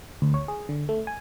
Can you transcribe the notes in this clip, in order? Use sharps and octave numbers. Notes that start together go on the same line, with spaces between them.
D2
C#5
G#4
D3
A3
G#5